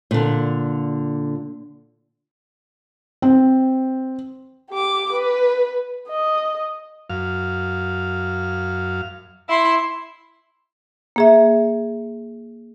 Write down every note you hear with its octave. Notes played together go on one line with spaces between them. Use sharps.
A#2 D3
C4
G4 D6
B4
D#5
F#2 F5
E4 E5 C6
A#3 G#4 E5